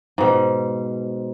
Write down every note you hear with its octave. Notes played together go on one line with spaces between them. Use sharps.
G#2 B2